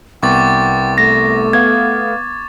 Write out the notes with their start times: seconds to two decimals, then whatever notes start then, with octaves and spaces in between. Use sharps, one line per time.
0.23 C2 B3 G5 C#6 D6 A6
0.98 A3 A#6
1.53 B3 F5 G#6